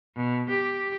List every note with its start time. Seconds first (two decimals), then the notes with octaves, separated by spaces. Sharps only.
0.16 B2
0.50 G4